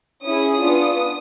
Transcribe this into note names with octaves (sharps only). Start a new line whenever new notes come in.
C#4 E4 G#4 D#6
B3 D4 F4